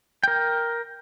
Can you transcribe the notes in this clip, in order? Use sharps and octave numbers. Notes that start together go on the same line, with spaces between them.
A#4 G5